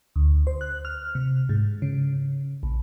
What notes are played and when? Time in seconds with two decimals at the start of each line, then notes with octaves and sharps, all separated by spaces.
0.16 D2
0.47 C5
0.61 F#6
0.85 F6
1.15 C3
1.49 G#2
1.82 C#3
2.63 A#1